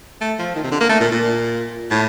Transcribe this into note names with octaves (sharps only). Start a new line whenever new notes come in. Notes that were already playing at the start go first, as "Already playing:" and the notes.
A3
F3
D#3
C3
D3
A#3
A3
A#2
A#2
A2